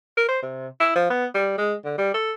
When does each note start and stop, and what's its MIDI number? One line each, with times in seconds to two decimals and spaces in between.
0.17 0.24 70
0.29 0.40 72
0.42 0.68 48
0.80 0.90 64
0.95 1.07 53
1.10 1.25 59
1.34 1.53 55
1.58 1.74 56
1.85 1.97 50
1.98 2.13 55
2.14 2.32 69